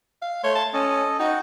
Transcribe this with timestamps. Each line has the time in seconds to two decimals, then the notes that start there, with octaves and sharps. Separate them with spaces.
0.22 F5
0.44 A3 C#5 C6
0.55 A5
0.73 C#4 A4 D#5
1.19 D#4 F#4 G5